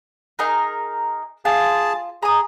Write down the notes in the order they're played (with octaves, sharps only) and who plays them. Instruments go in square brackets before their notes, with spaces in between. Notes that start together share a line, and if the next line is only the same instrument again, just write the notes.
[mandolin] D#4 G#4 A#4
[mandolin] F4 [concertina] G#4 A5
[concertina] G#4 [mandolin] A#5 D#6